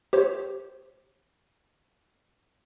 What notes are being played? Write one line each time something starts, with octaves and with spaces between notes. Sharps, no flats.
G4 C5 C#5